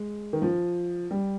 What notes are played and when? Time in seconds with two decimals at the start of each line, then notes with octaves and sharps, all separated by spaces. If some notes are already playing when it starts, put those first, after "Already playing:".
Already playing: G#3
0.33 D#3
0.42 F3
1.11 G3